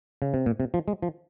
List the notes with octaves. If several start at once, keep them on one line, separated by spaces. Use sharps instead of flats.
C#3
C3
A#2
C3
F3
G#3
F3